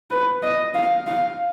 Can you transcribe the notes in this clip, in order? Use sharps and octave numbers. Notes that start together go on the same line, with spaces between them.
B4
D#5
F5
F5